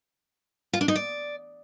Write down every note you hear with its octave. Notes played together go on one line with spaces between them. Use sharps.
F4
D4
D#4
D5